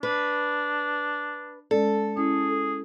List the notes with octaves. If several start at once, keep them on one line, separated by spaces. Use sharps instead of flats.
D4 B4
G#3 C#4 A4 D5
C#4 E4 G#4